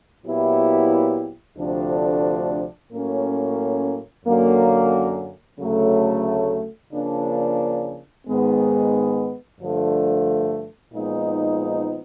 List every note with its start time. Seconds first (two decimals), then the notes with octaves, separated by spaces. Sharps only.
0.25 A#2 F#3 B3 E4 G4
1.58 D2 C3 F3 A3 D4
2.92 A2 F#3 A#3 C#4
4.25 F#2 D3 F#3 A#3 C#4
5.59 D2 C#3 F#3 A3
6.93 C#3 F3 A#3 D4
8.27 G#2 D#3 G#3 B3
9.60 G2 D3 F3 A3
10.93 A#2 F3 G#3 B3 D#4